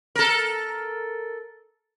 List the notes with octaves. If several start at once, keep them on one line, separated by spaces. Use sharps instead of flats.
A4 A#4